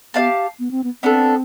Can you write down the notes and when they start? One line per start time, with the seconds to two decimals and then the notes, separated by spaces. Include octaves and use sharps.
0.14 B3 G4 D5 F5 A5
0.59 B3
0.71 C4
0.84 B3
1.03 B3 C4 D4 A4